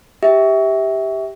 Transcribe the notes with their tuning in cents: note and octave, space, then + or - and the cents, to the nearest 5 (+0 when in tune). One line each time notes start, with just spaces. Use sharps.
G4 +0 E5 -20